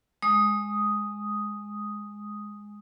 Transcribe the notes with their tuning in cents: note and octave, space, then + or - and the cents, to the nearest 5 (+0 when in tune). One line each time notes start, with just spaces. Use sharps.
G#3 +0 D#6 +0